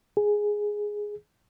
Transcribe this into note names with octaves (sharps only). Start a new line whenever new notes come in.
G#4